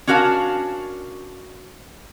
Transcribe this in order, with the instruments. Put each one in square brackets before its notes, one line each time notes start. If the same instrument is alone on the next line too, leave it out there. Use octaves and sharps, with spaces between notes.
[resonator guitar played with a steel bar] C#4 D4 F#4 A#4 F5 A5